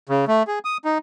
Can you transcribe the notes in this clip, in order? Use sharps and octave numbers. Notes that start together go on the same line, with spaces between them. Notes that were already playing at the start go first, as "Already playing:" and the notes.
C#3
A3
G#4
D#6
D#4